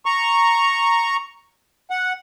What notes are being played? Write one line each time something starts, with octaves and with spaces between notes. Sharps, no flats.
A#5 C#6
F#5